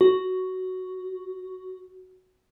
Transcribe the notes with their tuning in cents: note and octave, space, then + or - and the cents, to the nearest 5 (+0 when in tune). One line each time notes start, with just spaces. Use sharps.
F#4 +5